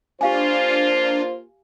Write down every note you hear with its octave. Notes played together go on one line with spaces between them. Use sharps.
A#3 D4 F4 G4 C5 F5 G#5